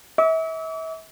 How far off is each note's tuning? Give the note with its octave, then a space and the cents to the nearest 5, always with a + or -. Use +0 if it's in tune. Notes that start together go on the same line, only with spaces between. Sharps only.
E5 -35 D6 -45